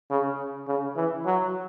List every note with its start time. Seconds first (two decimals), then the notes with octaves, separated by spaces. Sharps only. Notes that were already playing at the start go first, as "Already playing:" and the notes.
0.10 C#3
0.68 C#3
0.96 E3
1.26 F#3